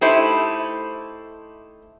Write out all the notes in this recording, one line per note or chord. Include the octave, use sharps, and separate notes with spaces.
A3 D#4 E4 G4 C5